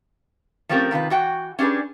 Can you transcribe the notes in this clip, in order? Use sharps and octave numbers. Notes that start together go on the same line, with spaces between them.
F3 A3 C4 C#4 G4 A#4
C3 D#3 F4 B4
E3 F#4 G5
C#4 D4 G4 G#4 B4